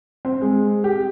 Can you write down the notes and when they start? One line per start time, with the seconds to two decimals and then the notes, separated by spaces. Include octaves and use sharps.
0.25 C4
0.42 G#3
0.84 G4